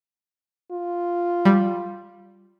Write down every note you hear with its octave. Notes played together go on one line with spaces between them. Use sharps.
F4
G3